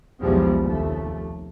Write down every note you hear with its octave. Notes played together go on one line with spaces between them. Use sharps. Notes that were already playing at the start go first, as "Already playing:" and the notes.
B1 E2 F3 G3 G#3
F1 D#2 A3